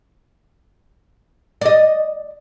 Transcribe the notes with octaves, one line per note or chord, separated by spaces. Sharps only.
D5 D#5